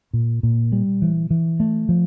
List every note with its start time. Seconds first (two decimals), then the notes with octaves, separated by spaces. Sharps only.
0.13 A#2
0.43 A#2
0.72 G3
1.02 E3
1.30 E3
1.60 A3
1.89 F3